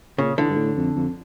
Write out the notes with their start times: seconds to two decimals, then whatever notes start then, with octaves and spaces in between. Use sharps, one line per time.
0.18 A#2 C#3
0.38 D3 E3
0.50 G2
0.57 A2
0.76 F2
0.96 F2